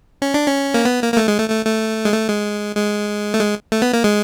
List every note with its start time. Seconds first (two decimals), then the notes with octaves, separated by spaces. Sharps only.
0.22 C#4
0.34 D4
0.48 C#4
0.74 A#3
0.85 B3
1.02 A#3
1.14 A#3
1.17 A3
1.28 G#3
1.38 A3
1.50 A3
1.65 A3
2.05 G#3
2.13 A3
2.29 G#3
2.77 G#3
3.34 A3
3.40 G#3
3.72 A3
3.82 B3
3.93 A#3
4.04 G#3